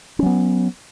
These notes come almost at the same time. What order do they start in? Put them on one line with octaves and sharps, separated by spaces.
C#4 F#3 B3